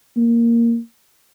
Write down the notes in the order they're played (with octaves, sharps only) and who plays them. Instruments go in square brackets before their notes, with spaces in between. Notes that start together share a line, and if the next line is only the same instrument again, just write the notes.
[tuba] A#3